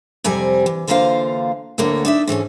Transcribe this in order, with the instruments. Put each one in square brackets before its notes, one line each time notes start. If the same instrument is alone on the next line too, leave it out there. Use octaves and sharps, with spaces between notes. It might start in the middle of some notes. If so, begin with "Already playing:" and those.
[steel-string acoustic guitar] F2 C3 G3 C4 G#5
E3
D3 E3 A#3 F4 C5 F5
D2 A2 D3 A#3 C#5
D4 D#4 E5
G#2 E3 A3 C#4